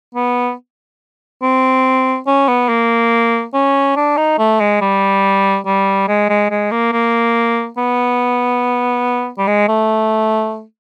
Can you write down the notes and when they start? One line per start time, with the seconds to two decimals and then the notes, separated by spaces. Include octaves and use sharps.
0.15 B3
1.42 C4
2.27 C#4
2.48 B3
2.69 A#3
3.54 C#4
3.96 D4
4.17 D#4
4.38 A3
4.60 G#3
4.81 G3
5.66 G3
6.08 G#3
6.29 G#3
6.51 G#3
6.71 A#3
6.92 A#3
7.77 B3
9.38 G3
9.47 G#3
9.68 A3